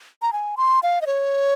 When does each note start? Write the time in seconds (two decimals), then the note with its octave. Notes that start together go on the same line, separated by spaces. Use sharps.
0.22 A#5
0.33 G#5
0.57 C6
0.83 F5
1.01 D#5
1.07 C#5